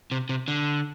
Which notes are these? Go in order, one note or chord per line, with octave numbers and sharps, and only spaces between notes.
C3
C3
D3